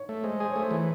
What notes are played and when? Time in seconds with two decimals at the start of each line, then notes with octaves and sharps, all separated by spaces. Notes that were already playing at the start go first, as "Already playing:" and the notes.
Already playing: C#5
0.09 A3
0.24 G#3 C5
0.40 G#4 C5
0.51 C#5
0.56 A3 C5
0.71 E3